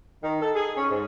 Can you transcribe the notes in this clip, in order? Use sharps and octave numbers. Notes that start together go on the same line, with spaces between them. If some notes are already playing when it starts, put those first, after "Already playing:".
D#3
A4
G#4
C#4
G#2